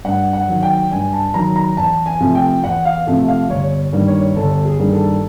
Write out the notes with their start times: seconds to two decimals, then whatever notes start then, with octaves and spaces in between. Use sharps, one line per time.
0.04 G2 F#5
0.33 F#5
0.48 D#3 F#3
0.63 G5
0.91 G2 G#5
1.13 A5
1.34 D#3 F#3 A#5
1.56 A#5
1.77 E2 A5
2.06 G#5
2.20 C3 F3 A3
2.35 G5
2.64 E2 F#5
2.85 F5
3.07 C3 F3 A3
3.28 F5
3.49 G1 C#5
3.93 G2 D#3 G3 A#3
4.07 C#5
4.36 G1 A4
4.65 G#4
4.79 G2 D#3 G3 A#3
4.93 A4